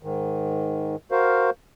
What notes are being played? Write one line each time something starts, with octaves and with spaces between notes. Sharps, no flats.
G#2 D#3
F#4 A#4 C5 F5